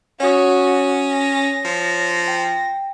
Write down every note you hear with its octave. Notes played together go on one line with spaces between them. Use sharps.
C#4 F#4 C#5 D#6
A#6
F3
G5